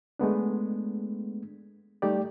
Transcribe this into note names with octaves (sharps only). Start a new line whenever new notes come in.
G#3 A3 B3 D4
G3 A3 D#4 G4 D5